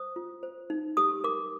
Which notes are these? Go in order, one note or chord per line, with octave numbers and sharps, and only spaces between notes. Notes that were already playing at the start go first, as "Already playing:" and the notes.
Already playing: C5 D#6
F4
C5
D#4
G4 D#6
A#4 D6